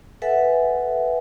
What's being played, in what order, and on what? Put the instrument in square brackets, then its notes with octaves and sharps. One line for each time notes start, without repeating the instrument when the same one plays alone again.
[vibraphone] A4 B4 E5 F#5 G#5